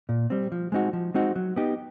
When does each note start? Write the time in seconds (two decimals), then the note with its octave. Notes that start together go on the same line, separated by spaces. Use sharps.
0.09 A#2
0.30 G3 C4
0.52 F3
0.72 G#3 C4 D#4 F#4
0.93 F3
1.14 G#3 C4 D#4 F#4
1.36 F#3
1.56 B3 D#4 G4